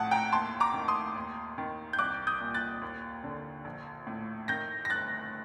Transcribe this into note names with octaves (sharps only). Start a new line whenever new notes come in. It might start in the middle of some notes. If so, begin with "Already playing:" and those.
Already playing: A#1 A2 F#5 A5 D#6
G5 A#5
D#2 A5 C6
A#5 D6
D#3
C6 D#6
D#2
D#3
G6
C2 D6 F#6
D#6 G6
A#2
F#6 A6
D#2
D3
A#1
A2
D#3 G6 A#6
A#6
G1 F#6 A6